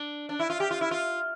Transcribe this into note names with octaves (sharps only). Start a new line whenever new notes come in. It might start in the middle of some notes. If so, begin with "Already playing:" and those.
Already playing: D4
D4
E4
F4
G4
F4
E4
F4